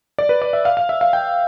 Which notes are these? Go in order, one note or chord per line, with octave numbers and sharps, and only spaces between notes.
D5
B4
D5
E5
F5
F5
E5
F5
G5